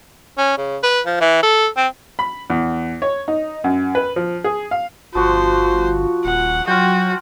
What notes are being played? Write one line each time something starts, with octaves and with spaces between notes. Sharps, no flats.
C#4
C#3
B4
F3
E3
A4
C4
B5
E2
C#5
D#4
F#2
B4
F3
G#4
F5
G1 F3 F4 F#4 C5
D#1 F#5
F#3 F4 F#4 G5